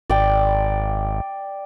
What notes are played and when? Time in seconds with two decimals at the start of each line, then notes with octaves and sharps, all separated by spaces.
0.10 G#1 D5 G5